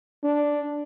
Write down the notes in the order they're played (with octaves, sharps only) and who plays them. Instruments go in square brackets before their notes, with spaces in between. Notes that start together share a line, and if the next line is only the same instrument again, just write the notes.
[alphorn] D4